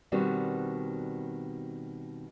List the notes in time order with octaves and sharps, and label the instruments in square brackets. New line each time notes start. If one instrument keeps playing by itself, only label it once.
[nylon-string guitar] B2 D#3 G3 C4 D4 F#4